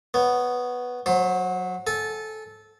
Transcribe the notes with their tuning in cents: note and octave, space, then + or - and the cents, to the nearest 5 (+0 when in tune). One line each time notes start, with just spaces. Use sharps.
B3 +0 C#5 +0
F#3 -15 C5 +25
A4 -15 G#5 -5